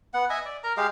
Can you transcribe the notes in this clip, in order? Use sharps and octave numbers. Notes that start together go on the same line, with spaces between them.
B3 F#5
D#5 E5 G#5
D5
A#4 A#5
G#3 G4 G#4 F5